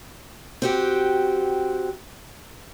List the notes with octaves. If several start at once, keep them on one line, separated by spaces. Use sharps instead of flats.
C4 F#4 G4